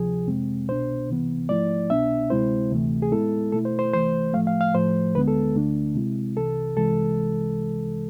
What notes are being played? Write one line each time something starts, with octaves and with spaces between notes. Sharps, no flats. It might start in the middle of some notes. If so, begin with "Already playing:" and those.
Already playing: D2 C3 F3 G#4
F2 C3 G#3 C4
C2 B2 B3 D4 C5
C2 C3 E3 B3
G#2 F3 A3 E4 D5
C2 B2 B3 D4 E5
D2 C3 G#3 C4 E4 C5
D2 C3 E3 A3
G#4
A2 G#3 B3 E4 A4
B2 A3 E4 A4
C5
C5
C2 C3 E3 A3 C5
A2 F3 A3 F5
F5
F5
A2 F3 A3 C5
D2 D3 G#3 B3 B4
A4
D2 D3 A3 D4
C3 G#3 C4 E4
C2 C3 E3 A4
C2 C3 E3 G#3 A4